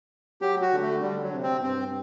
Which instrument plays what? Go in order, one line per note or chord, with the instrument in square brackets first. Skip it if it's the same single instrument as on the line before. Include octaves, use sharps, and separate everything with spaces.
[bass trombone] F#3 [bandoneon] G4
[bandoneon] F#4
[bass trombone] D3
[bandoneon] A3
[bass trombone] D3 [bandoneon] G3
[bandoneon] F#3
[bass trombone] C3
[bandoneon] C4
[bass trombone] G2 [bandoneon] C4